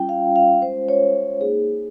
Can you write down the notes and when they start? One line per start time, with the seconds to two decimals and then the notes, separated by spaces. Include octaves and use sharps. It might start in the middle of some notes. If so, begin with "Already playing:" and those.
Already playing: G3 C#4 F4 G5
0.09 F5
0.36 F5
0.62 G#3 C#4 F4 C5
0.89 C#5
1.41 A#3 D#4 G#4